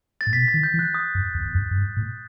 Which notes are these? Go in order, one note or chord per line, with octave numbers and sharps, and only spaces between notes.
A6
A2
B2 B6
A6
D#3
G6
E3
F#6
D#6
F#2
E2
E2
F#2
F#2
G2
A2